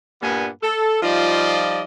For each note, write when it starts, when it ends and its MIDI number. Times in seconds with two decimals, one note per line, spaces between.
0.22 0.49 43
0.22 0.49 46
0.22 0.49 55
0.22 0.49 58
0.22 0.49 59
0.22 0.49 80
0.62 0.99 69
1.02 1.81 53
1.02 1.81 55
1.02 1.81 63
1.02 1.81 65
1.02 1.81 74
1.02 1.81 75